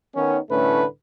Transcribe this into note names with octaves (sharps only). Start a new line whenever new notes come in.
D#3 B3 C#4
C2 A2 D3 A3 C#4 B4